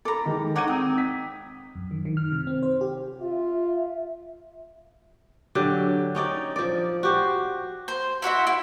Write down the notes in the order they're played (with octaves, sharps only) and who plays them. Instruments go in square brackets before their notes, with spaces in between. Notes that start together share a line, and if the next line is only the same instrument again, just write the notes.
[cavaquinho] A4 A#5 [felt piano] B5 D6
[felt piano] D#3 G#3
[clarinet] D#4 [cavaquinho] C#5 F#5 [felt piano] D6 G#6 D#7
[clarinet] C4 [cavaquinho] D#6
[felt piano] B6
[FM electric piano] F#2
D#3
D#3
F6
C3
C4
C5
G4
[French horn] F4 [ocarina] E5
[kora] D3 F#3 G4
C#4 D#4 D5 G5
F3 D5
F#4 G4 C5
[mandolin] C5
E4 F#4 C5 E5
E4